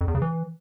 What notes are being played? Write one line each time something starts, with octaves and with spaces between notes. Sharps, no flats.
F2
E2
C#3
E3